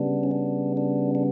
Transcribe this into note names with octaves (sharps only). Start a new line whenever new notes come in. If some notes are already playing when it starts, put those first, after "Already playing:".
Already playing: C#3 G3 B3 D4
C#4
D4
D4
D4